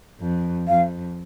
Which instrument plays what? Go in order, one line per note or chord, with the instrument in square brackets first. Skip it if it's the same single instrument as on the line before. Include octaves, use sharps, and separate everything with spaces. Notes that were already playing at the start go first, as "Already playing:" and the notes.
[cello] F2
[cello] F2 [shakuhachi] F5